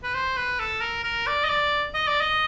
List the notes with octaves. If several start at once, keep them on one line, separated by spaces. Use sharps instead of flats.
B4
C5
B4
A4
A#4
A#4
D5
D#5
D5
D#5
D5
D#5